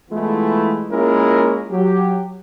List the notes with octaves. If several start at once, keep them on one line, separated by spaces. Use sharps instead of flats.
E3 G#3 A3 B3 E4 F4
G#3 A#3 C#4 E4 F4 A#4
F#3 G4